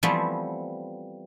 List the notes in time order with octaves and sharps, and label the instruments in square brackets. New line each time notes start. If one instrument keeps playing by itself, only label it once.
[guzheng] E3 F3 G3 A3 B3 C4